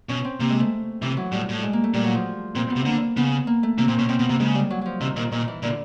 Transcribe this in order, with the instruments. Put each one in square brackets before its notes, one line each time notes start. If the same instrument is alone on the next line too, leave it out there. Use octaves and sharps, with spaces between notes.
[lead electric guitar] B2 [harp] C#4
[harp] C4
[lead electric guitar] C3 [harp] A#3
[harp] G#3
A3
[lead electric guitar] C3 [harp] E3
[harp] F#3
[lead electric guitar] A2 [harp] G3
[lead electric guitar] A2
[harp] G#3
A#3
A3
[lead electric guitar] A#2 [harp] G3
[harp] F#3
F3
[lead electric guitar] A#2 [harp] C4
[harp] B3
[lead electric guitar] C3
[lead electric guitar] D3 [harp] A#3
[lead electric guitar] C#3 [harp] B3
[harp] A#3
A3
[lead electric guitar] C3 [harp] A#3
[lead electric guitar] A#2 [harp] C4
[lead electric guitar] B2 [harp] C#4
[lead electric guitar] B2 [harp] C4
[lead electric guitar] B2 [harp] B3
[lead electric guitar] C3 [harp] A#3
[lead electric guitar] C#3 [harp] G#3
[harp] G3
F#3
F3 F#3
[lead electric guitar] C3 [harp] D#3
[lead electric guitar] A#2 [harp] D#3
[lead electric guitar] A#2 [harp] D#3
[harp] E3
[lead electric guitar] A#2 [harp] D3